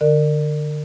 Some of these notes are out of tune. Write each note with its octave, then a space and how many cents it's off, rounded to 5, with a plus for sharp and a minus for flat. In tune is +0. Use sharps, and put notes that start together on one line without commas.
D3 +15 A#4 -25 D5 +30